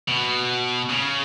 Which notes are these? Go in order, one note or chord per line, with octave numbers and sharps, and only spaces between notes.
B2
C#3